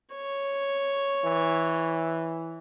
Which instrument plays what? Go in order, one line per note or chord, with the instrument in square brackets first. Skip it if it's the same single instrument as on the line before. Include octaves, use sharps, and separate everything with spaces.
[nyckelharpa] C#5
[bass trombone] E3